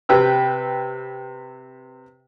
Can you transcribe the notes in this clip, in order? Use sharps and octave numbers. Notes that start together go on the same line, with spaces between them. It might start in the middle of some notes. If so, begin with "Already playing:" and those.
C3 B4 G5 E6